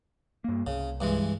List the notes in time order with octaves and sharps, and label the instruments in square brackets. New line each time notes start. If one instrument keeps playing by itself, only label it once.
[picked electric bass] G2 A#3
[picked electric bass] C2 [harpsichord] C#3
[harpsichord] G2 E3 G#3